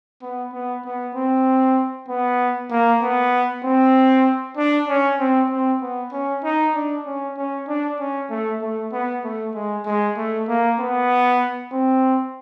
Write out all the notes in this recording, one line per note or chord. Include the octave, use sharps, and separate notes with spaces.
B3
B3
B3
C4
B3
A#3
B3
C4
D4
C#4
C4
C4
B3
C#4
D#4
D4
C#4
C#4
D4
C#4
A3
A3
B3
A3
G#3
G#3
A3
A#3
B3
C4